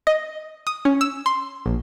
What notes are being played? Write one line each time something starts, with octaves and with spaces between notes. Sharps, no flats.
D#5
D#6
C#4
E6
C6
A#1